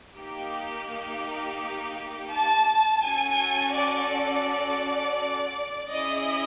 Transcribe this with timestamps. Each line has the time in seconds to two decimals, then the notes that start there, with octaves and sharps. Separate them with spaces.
0.16 A#3 D#4 G4
2.32 A5
3.03 C#4 F#4 A4 G#5
3.74 D5
5.90 C#4 E4 G#4 D#5